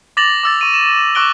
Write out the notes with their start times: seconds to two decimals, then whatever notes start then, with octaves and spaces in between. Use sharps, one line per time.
0.17 D6 A6 A#6 F7 F#7
0.43 D6 E6 A6
0.61 C#6 D#7
0.74 E7
1.15 C#6 D6 E6 F#6 D7 G7